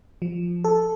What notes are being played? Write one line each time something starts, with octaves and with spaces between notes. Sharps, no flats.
F3
A4